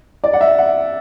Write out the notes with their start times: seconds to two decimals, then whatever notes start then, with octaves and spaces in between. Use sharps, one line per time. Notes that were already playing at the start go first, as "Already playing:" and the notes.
0.24 D5
0.33 F#5
0.41 E5
0.58 F#5